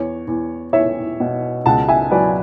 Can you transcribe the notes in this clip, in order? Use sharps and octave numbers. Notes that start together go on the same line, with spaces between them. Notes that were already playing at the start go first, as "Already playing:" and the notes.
Already playing: E2 C#5
E2
E2 C#5 E5
B2
C#2 F#5 A5
E5 G#5
F#3 B4 D5